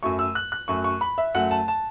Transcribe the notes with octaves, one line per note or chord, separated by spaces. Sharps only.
F#2 F#3 A3 C#6
E6
F#6
F#6
F#2 F#3 A3 C#6
C#6
B5
E5
F#2 F#3 A3 F#5
A5
A5